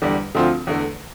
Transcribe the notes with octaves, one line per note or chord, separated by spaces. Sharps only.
E2 D3 G3
D2 D3 F3 C4 F4
E2 D3 A3